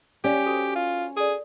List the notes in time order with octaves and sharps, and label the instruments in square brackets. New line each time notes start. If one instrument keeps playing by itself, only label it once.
[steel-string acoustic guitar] C#4 [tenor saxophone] G4 [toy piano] D5 F5
[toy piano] F#4 A4 C5
[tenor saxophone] F4
[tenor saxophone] G#4 [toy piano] A4 D5